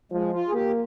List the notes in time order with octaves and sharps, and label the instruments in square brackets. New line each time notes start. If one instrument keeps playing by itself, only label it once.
[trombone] F3 [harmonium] G#3
[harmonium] F4
G#4
[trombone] A#3 [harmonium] G4